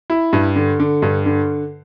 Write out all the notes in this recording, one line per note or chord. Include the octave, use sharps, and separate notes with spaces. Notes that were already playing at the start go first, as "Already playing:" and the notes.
E4
G2
D3
D3
G2
D3